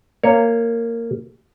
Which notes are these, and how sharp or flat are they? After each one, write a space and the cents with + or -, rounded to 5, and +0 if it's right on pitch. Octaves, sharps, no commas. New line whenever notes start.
A#3 -15 C#5 +0